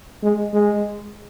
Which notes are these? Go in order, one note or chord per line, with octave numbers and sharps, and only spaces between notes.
G#3
G#3